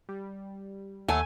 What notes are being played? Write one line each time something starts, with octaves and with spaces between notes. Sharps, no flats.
G3
D#2 F#3 A3 A4 G#5